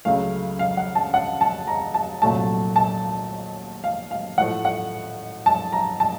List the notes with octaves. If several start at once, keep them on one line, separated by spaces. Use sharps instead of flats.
C#2 C#3 F#3 A3 F5
F5
F#5
A5
F#5
A5
A#5
A5
C2 A#2 F#3 A3 A5
A5
F5
F5
A2 F3 A3 F#5
F#5
A5
A#5
A5